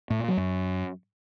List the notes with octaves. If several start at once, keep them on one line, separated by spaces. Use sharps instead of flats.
A2
A#2
F#3
F#2